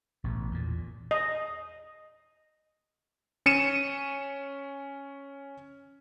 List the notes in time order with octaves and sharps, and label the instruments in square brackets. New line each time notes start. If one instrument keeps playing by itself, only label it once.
[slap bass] A1 B2
E2 A#2
[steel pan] D#5
[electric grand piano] C#4 C#7 D#7 E7